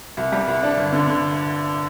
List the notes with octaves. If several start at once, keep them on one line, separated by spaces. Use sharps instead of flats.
C2
G3
C2
D4
G1
D3
D3